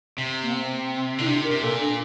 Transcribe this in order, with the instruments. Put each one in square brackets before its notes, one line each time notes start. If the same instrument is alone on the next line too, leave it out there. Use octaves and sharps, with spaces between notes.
[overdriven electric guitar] C3
[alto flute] A#3
C4
[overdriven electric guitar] D3 [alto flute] E4
[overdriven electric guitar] C3 [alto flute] D4
[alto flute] A#4
[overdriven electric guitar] C3
[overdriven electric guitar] A#2 [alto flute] A4
[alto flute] D4